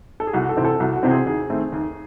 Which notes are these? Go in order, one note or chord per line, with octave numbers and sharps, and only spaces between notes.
A4
G#4
C2 F#4
A4
C3 E3 C4
A4
C2 F#4
F#4
C3 E3 C4
G#4
D#2 G#4
D#3 A3 C4
D#2